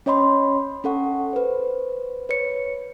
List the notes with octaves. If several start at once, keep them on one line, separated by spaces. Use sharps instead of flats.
C#4 C#5 D#5 B5 C6
C#4 A4 F#5 C#6
B4 C5
B4 C#5 C#7